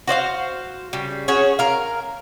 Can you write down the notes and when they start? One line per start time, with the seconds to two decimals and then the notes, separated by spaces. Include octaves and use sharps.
0.07 F#4 C5 D5 F5
0.93 C#3 G3
1.28 C#4 F#4 G#4 C#5
1.59 A#4 F5